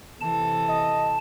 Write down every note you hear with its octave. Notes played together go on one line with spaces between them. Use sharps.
C3 E3 A4 A5
D#5